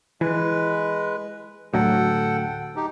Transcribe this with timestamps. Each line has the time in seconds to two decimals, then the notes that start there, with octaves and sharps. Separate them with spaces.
0.21 E3 G#3 B4
1.74 D2 A2 F#3 A4 F#5 G5
2.76 D#4 G4